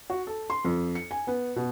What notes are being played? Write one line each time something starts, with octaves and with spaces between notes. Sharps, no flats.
F#4
A4
C6
F2
C#7
G#5
B3
B2